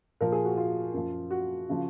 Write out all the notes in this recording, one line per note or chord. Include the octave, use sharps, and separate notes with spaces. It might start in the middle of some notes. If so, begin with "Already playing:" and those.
A#2 F3 A#4
G#4
F#4
F4
F#2 F3
F#4
C#3 F3